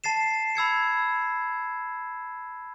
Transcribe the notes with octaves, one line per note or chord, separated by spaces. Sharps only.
A5 A6 C7 E7
B5 E6 G#6 C#7